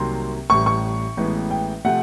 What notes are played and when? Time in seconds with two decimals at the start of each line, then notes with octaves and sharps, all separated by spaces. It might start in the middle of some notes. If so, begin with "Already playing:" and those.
Already playing: C2 C3 D#3 F#3 A#3 C6
0.50 A1 A2 E3 G3 C#6
0.66 C#6
1.17 A1 A2 E3 G#3 B3
1.51 G5
1.85 C3 F3 A3 F#5